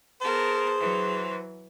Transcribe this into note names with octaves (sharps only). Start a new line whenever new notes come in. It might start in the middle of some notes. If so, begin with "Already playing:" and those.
B3 G#4 A#4 C5 A5
E3 F#3